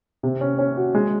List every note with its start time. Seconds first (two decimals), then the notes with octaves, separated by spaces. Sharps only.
0.23 C3
0.41 C#4
0.59 C#4
0.77 F#4
0.95 G#3